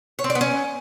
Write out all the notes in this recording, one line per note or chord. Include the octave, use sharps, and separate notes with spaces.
C#5
C4
D5
B3
C#4